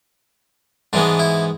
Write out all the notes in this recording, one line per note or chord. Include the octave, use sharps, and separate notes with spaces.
G#2 E3 G#3 B3 D4
E4